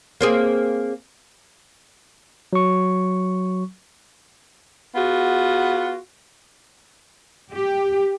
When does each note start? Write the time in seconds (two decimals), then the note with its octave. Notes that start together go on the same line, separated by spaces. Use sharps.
0.21 A#3 C4 G#4
2.53 F#3 C#6
4.95 B3 F4 F#4 G#4
7.54 G4